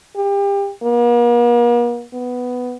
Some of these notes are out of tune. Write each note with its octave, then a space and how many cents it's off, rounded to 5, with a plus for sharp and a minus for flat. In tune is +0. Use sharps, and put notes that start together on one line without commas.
G4 +30
A#3 +45
B3 +5